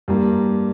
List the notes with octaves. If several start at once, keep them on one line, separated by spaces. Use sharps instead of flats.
G2 G3 A#3